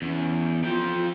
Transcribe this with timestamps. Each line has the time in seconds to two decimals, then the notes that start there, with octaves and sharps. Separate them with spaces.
0.02 E2 C#4
0.64 F3 F4 G5